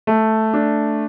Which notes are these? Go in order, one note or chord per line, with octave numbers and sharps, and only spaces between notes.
A3
D4